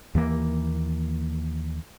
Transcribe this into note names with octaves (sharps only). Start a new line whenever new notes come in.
D#2 E3 A#3